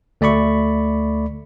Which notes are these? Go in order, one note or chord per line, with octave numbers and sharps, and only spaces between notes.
D2 A3 D5 B5 C#6